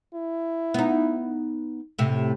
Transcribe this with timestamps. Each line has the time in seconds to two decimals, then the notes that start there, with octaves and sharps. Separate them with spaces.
0.14 E4
0.74 B3 D#4
1.99 A2 C3